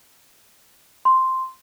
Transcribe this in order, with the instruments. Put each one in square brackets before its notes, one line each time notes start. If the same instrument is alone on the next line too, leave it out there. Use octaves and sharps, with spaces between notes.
[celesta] C6